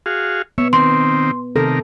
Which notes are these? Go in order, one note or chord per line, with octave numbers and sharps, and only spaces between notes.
F#4 G#4 F5
B3 C#5 E5
D#3 C4 C6
C3 D#3 A4 A#4